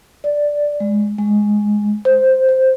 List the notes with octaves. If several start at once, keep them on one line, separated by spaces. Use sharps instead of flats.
D5
G#3
G#3
C5
C5